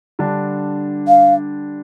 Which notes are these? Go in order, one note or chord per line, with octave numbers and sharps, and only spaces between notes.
D3 G3 D4
F5